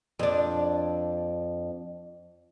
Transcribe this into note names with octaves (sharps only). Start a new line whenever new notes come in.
F2 D4